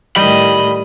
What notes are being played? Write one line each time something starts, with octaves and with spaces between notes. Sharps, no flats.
A2 D#3 G3 D#5 B5